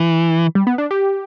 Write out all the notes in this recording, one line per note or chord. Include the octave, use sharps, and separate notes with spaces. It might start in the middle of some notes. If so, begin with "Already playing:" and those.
Already playing: E3
G3
B3
D4
G4